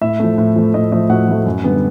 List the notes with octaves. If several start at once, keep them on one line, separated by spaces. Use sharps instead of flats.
A2 E4 E5
F3 A3
A2
F3 A3
A2 D#5
F3 A3 D#5
A2 F#4 F#5
F3 A3
F#2
D3 G3 B3